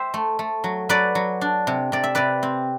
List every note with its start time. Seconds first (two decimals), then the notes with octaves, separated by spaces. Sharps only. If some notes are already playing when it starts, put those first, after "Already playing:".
Already playing: C5 E5 G5
0.14 A3
0.39 A3
0.64 F#3
0.89 F#3 B4 D5
1.15 F#3
1.41 D4
1.67 C3
1.92 C3 D5
2.04 E5
2.15 C3 B4 D5
2.43 C4